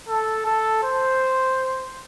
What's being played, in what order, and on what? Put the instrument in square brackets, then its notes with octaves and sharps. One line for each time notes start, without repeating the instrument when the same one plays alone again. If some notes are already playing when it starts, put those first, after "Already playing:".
[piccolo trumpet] A4
A4
C5